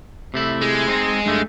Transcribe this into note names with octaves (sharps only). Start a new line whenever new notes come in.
C3 A3 E4
G#3
C4 D#4
G2 A3